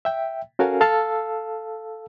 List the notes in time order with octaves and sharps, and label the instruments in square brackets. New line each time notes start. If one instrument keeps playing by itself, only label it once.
[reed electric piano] E5 G5
C#4 F#4 A4 A#4 F5 G#5
A4 F5 A5 E6